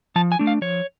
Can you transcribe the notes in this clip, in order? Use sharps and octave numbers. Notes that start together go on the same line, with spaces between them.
F3 A5
G#5
A3 D4
F5
F3 C#5